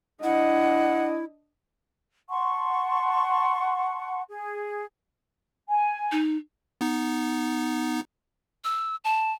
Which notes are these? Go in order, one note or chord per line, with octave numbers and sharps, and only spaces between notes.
D4 E4 D#5 F#5
F#5 A5 C6 C#6
G#4
G#5
D#4
B3 D#4
E6
A5